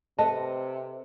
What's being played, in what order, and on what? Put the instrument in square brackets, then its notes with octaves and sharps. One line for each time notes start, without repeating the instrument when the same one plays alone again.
[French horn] C3 [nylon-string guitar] A4 B4 D#5 [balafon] A5